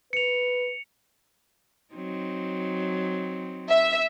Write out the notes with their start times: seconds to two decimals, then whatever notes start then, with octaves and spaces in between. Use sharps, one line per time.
0.13 B4 C#7 F7
1.94 F#3 C4 D#4
3.70 E5